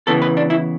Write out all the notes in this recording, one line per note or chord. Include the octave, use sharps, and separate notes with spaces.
C#3 E3 B3 A4
B4
D4
E4